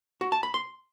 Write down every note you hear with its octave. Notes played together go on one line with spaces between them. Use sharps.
F#4
A5
B5
C6